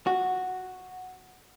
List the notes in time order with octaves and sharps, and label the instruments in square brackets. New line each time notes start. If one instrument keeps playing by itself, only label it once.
[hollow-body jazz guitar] F#4